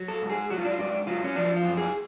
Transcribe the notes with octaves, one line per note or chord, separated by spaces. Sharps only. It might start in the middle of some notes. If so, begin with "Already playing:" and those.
Already playing: F#3
A4
G#2
G#4
F#3 F#4
F4
D4
F4
G#2 D4
F#3 F4
C#4
F3 D4
F4
F#2
G#4